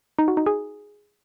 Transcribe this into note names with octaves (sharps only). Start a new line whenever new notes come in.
D#4
F#4
D#4
G#4